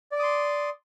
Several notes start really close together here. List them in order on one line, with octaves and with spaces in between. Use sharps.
D5 D6 D#6 C6